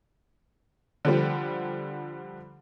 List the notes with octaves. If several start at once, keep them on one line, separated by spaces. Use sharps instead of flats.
D3 F3 G3